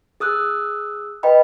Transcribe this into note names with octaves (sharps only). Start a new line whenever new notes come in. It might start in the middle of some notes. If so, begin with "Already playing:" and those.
G#4 D#6 E6 F#6
B4 D#5 G5 B5